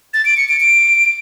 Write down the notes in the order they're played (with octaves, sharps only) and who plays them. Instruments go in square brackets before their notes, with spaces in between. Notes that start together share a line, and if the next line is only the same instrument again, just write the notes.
[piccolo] A6
D7
C#7
D7
D7